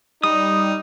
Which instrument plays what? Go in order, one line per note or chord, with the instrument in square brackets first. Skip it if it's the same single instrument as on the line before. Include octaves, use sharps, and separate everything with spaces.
[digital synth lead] G3 [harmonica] D#4 [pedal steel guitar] D#6